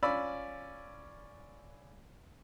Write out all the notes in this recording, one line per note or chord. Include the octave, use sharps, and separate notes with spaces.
C#4 F4 D5 B5 E6